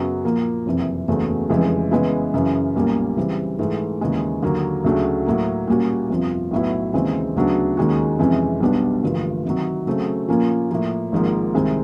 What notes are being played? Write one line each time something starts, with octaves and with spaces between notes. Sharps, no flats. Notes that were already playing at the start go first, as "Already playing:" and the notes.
Already playing: F#2 C#3 F#3 B3
A#2 F3 A#3
F#1 F2 C3 E3
F#1 E2 C#3 F#3 A3
F1 F2 C#3 E3 G#3
C#3 E3 G#3 B3 E4
F#2 C#3 E3
B1 A#2 G3 A#3 C#4
C#3 E3 G3 C4
G#2 E3 A3
D#2 C#3 E3 G#3
D#2 D3 F#3 A#3
D2 C#3 F#3 A3 D4
A2 F#3 A#3
A#2 G3 A#3 C#4 F#4
G1 F2 C3 F3
B1 A2 F#3 B3 E4
D#2 C#3 E3 G#3 C4
D2 C#3 F#3 B3 D4
D#2 D#3 G#3 C#4 F#4
F2 C3 E3 G#3 C#4
B1 B2 G3 B3 D4
A1 G2 D3 F3 A#3
C3 D#3 F#3
C#3 F#3 A3 C4
A#2 F3 A#3 C#4
A2 F3 A#3
G#1 G#2 F3 A#3
C2 C3 D#3 G#3 C4